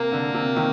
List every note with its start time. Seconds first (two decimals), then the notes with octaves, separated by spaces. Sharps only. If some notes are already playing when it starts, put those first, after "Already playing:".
Already playing: C3 A#3
0.12 D3
0.34 C3
0.56 C3 D#3